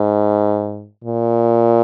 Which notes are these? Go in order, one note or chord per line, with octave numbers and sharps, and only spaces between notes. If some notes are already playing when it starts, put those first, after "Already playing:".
Already playing: G#2
A#2